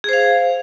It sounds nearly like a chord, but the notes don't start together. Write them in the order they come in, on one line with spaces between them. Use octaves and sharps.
G#4 C5 F5